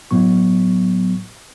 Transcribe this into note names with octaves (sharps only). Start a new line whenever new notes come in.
A2 F#3 B3 C#6